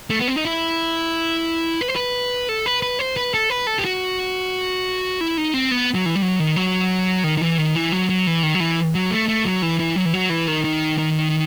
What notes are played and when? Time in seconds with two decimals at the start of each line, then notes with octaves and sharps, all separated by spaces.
0.10 A3
0.20 B3
0.28 C4
0.36 D#4
0.45 E4
1.81 B4
1.88 C5
1.96 B4
2.49 A4
2.66 B4
2.82 B4
2.99 C5
3.17 B4
3.34 A4
3.50 B4
3.67 A4
3.79 G4
3.85 F#4
5.21 E4
5.38 D#4
5.54 C4
5.71 B3
5.95 F#3
6.06 E3
6.15 G3
6.22 F#3
6.40 D#3
6.56 F#3
7.24 D#3
7.37 D#3
7.41 E3
7.58 D#3
7.76 E3
7.92 F#3
8.09 F#3
8.27 E3
8.43 D#3
8.55 F#3
8.60 E3
8.95 F#3
9.11 A3
9.29 A3
9.45 F#3
9.62 E3
9.80 E3
9.96 F#3
10.05 E3
10.14 F#3
10.30 E3
10.48 D#3
10.64 D#3
10.98 D#3